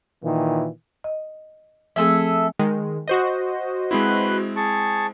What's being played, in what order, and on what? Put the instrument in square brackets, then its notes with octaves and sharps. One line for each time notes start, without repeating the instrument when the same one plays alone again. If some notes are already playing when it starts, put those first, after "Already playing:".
[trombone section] A#2 D#3 E3
[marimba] D#5
[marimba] F3 A3 C4 [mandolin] G#4 A4 E5
[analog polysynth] D#3 G#3
F#4 C5 D#5
[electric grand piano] G#3 C4 E4 [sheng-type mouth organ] B4 C6 F#6
[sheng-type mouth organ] G#4 A5 C#6